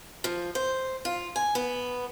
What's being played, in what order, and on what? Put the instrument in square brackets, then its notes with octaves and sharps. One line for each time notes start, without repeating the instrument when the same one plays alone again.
[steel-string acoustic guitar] F3
C5
F4
G#5
B3